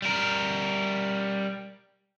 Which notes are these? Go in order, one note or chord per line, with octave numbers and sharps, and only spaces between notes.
G3 A#4